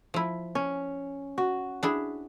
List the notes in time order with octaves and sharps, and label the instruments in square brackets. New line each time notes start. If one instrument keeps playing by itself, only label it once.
[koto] F3 E4
[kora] C#4
F#4
[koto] D4 E4 G#4